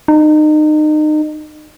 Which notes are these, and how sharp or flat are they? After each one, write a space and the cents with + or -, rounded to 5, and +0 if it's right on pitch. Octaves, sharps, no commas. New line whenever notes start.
D#4 -30